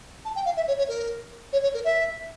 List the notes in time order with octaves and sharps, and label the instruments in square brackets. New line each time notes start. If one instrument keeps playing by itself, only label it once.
[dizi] A5
G5
F5
E5
C#5
C#5
A#4
C#5
C#5
A#4
E5